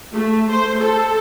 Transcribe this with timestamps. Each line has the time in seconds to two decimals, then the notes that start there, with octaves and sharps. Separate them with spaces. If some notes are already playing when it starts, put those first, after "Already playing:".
0.13 A3
0.50 C5
0.80 A4